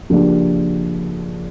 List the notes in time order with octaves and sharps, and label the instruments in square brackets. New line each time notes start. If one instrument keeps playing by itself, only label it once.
[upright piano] C#3 F3 A#3 D4 G4